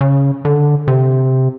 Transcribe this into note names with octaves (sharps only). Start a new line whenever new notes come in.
C#3
D3
C3